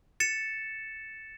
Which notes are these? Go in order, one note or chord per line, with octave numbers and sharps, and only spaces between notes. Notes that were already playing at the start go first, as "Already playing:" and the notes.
A6 C#7 E7